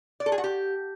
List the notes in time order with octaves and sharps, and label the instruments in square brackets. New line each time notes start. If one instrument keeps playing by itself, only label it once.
[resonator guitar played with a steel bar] D5
A4
G#4
F#4
G4